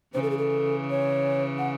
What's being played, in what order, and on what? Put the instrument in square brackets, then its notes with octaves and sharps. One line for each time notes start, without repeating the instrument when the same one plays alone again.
[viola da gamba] C#3 E3 [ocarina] C5
[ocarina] A4
G#4
A4
C#5
F#5